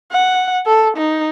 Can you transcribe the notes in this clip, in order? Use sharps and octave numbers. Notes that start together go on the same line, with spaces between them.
F#5
A4
D#4